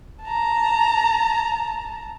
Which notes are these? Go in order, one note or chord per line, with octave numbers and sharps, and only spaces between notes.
A5 A#5